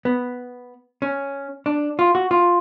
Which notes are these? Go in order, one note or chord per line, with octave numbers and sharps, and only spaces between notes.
B3
C#4
D4
F4
F#4
F4